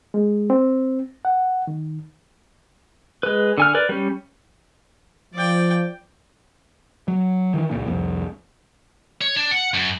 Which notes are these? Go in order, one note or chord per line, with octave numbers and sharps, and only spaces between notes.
G#3
C4
F#5
D#3
G#3 B4
D3 G#5 F6
A#4 B4 D5
G3 C#4
F3 D5 G5
F#3
D#3 E3
C#2 A#2
C2 F2
C#5
D4
F#5
F#2